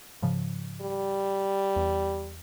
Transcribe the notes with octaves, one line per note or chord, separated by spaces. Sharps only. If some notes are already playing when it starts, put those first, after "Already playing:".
G#2 C#3 F3
G3
E2